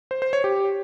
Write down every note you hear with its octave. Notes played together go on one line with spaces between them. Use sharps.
C5
C5
C#5
G4